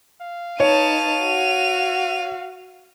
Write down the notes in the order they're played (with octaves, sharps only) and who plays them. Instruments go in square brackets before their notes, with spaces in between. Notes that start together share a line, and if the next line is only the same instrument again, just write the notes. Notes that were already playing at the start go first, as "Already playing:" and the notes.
[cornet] F5
[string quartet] D#4 B4 A5 [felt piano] C#5 [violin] D#7 F7
[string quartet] F#4